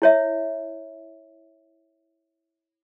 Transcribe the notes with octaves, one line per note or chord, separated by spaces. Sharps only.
E4 C#5 E5